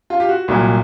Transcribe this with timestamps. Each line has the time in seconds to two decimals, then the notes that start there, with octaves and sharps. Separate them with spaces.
0.10 F4
0.20 G4
0.29 F#4
0.48 C2 A#2 F#3